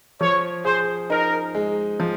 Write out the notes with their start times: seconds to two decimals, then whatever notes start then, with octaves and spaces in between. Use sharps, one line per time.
0.21 F3 C#5
0.65 G#4 C5
1.09 D#4 A#4
1.55 G#3
2.00 F3